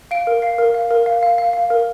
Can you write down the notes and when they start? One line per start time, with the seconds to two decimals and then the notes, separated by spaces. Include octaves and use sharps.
0.11 F5 D7
0.27 A#4
0.42 F5 C7
0.58 A#4
0.74 F5
0.91 A#4
1.06 F5
1.23 F5
1.38 F5
1.53 F5
1.70 A#4